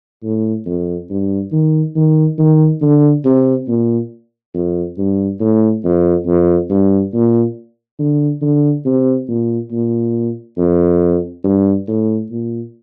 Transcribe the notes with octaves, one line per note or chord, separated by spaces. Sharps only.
A2
F2
G2
D#3
D#3
D#3
D3
C3
A#2
F2
G2
A2
F2
F2
G2
A#2
D3
D3
C3
A#2
A#2
F2
G2
A2
A#2